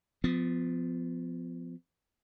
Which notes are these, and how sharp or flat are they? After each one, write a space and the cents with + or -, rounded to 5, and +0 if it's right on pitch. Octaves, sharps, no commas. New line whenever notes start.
F3 +0 B3 +40